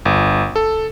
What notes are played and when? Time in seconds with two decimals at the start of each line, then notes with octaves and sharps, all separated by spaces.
0.05 G1
0.56 A4